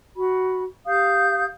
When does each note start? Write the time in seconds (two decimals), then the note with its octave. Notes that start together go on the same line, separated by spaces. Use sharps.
0.16 F#4 B5
0.87 G4 F5 D#6 G6